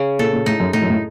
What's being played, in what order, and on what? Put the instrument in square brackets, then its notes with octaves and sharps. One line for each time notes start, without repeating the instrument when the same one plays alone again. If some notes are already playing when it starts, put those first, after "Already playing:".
Already playing: [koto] C#3
[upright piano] A#2 [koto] A4
[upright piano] A#2
[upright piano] A2 [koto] D#4
[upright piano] F#2
[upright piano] A2 [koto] D#4
[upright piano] F#2
A2